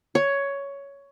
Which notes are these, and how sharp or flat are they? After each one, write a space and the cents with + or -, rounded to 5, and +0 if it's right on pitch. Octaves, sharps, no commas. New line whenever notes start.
C#5 +10